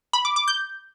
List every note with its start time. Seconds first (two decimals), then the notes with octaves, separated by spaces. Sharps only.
0.13 B5
0.25 D6
0.36 D6
0.48 G6